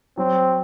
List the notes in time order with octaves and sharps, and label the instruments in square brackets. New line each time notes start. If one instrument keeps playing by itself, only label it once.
[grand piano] F#3 [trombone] C4